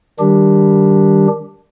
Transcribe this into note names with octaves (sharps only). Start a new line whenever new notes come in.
D#3 G3 D4 G4